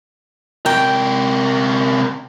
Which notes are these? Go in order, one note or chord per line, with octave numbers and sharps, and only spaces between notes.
C3 A#4 G5